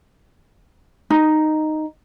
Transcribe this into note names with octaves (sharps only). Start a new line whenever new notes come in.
D#4